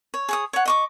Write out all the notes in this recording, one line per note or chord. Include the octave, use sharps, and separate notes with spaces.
C#5
G#4 C#5 D#6
C#5 F#5
D#5 C#6 D6